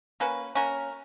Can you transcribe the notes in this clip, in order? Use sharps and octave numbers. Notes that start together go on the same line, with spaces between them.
A#3 C#4 F#4 B4
A#3 C#4 F#4 A#4